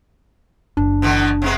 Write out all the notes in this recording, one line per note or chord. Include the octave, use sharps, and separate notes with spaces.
F#1 D4
B2 D3 E3
C3 G#3 B3